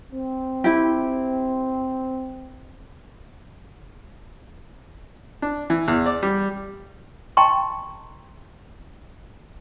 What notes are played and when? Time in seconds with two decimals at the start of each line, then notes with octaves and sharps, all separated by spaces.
0.13 C4
0.64 E4 G4
5.42 D4
5.70 E3
5.88 E2
6.06 D5
6.23 G3
7.37 D#5 G5 A5 A#5 C6 C#6